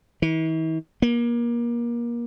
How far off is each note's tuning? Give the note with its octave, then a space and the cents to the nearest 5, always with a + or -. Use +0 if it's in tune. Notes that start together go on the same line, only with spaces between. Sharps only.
E3 -45
A#3 +30